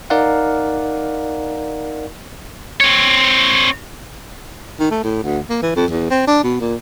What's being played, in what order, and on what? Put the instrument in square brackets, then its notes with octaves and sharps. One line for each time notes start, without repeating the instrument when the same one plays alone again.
[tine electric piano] D#4 A#4 D5 F5 F#5
[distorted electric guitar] C4 C#5
[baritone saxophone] D#3
A3
A2
D2
A#3
E3
F2
E2
C4
D4
B2
A#2